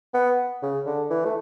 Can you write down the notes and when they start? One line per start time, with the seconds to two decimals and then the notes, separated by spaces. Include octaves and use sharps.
0.14 B3
0.63 C#3
0.86 D3
1.10 E3
1.25 A3